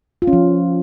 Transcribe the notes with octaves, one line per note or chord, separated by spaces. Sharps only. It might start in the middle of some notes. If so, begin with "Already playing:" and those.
F4
C#4
F3